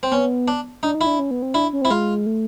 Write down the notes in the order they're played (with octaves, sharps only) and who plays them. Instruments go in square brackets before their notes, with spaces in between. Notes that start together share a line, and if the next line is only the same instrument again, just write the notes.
[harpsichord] C4
[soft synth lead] B3 [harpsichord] C#4
[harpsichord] D4
[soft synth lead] D4 [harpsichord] D#4
[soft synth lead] D#4
[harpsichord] E4
[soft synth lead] D4
C#4
B3
C4
[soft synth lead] D4 [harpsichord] E4
[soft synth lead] C#4
[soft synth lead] C4 [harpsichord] E4
[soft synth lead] G#3 [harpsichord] F4
[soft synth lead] A3